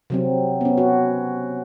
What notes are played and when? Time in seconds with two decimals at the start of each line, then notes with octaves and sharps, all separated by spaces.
0.10 C3 F#3 C4
0.61 B3 C#4
0.78 F#4